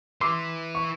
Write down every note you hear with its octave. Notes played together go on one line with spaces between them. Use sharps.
E4 B4 C6 D6 E6
C#6